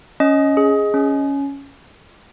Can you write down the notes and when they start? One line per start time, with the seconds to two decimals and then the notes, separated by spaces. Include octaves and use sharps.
0.20 C#4 D#5
0.57 G#4
0.94 C#4